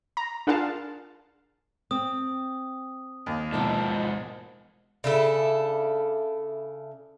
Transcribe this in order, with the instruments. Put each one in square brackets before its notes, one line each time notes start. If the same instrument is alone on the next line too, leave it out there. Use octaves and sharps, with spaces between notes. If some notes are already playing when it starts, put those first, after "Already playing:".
[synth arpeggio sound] A#5
D4 F4 G#4 A#4 F5 A5
[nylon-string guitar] C4 [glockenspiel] D#6
[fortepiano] D#2
[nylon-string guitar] E2 B2 F3 [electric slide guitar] G#2 A4
[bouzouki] C#3 D4 E4 A4